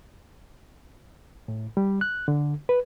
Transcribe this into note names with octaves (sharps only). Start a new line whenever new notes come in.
A2
G3
F#6
D3
B4